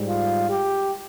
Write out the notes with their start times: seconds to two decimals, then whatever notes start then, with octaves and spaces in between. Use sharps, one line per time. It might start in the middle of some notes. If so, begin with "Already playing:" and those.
Already playing: G#2 G3
0.09 F4
0.50 G4